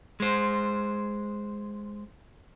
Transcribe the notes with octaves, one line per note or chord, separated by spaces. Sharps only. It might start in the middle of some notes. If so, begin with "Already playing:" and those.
G#3 C5